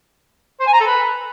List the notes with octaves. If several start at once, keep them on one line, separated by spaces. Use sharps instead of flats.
C5
G#5
A#5
A4
B4